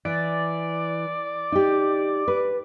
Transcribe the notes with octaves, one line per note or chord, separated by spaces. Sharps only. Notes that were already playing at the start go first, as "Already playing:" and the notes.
E3 D5
D#4 G4
B4